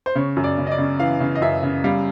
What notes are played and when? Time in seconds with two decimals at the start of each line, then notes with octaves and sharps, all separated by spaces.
0.06 C5
0.15 C#3 C#5
0.37 F#2
0.44 D5
0.58 C#3
0.67 D#5
0.71 D5
0.78 C#3
0.99 E3 F5
1.20 C#3
1.35 D#5
1.42 F#2 E5
1.63 C#3
1.84 G3 F5